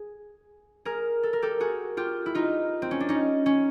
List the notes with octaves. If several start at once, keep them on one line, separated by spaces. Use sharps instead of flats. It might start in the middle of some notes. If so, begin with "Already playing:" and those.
Already playing: G#4
G#4 A#4
A4
A#4
G4 A4
F#4 G#4
F4 G4
E4
D#4 F4
C4
C#4
D4
C#4 D#4
C#4